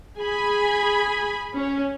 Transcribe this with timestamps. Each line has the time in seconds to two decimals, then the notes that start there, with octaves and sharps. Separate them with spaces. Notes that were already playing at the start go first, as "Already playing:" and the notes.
0.18 G#4 G#5 B5
1.55 C#4